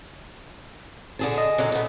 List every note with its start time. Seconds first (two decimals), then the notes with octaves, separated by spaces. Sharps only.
1.19 D3 G#4 A5
1.38 D#5
1.58 F#2 D3 F#3
1.72 A3 B3